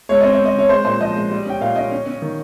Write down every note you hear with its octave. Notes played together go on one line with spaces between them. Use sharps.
G#3 C#5
C4 D#5
C#5
C4
D#5
C#3 C#5
G#3 C5
A#2 C5
F3 D#5
G#3
G3
C#4 G5
A#2 F5
C#4 D#5
C#4
C#4
D#3